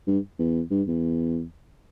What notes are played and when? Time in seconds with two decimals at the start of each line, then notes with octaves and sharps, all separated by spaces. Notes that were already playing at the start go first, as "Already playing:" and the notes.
0.07 G2
0.39 E2
0.71 G2
0.88 E2